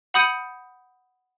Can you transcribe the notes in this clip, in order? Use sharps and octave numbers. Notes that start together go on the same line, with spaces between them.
F#5 B5 D#6 G6 C#7 D#7